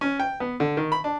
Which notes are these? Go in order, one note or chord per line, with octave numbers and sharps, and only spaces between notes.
C#4
G5
B3
D3
D#3
B5
D4